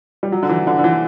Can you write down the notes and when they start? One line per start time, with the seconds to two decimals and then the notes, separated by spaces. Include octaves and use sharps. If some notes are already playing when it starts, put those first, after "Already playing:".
0.23 G3
0.32 F#3
0.43 D3
0.49 E3
0.67 D3
0.79 D3
0.84 E3